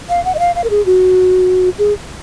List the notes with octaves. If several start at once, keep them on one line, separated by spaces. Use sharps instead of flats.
F5
F#5
D#5
F5
F5
A#4
G#4
F#4
G#4